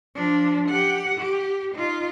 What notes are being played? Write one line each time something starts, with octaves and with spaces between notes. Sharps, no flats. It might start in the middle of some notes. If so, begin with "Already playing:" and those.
F3 D4
G4 F#5
G4
D#4 F4